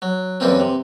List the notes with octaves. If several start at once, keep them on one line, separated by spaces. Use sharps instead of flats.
F#3
F#2 E3 G3 A#3 C4 C#4
C3